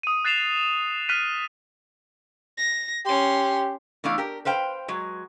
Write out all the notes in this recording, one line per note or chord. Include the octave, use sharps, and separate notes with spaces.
D#6 D#7
F#6 A6 C7 E7 F7
F6 F#6 B6 D#7
A#6
C#4 G4 C6
E3 A3 B3 D4 D5 F5
G4 A#4
B4 C5 F5 G5
F#3 G#3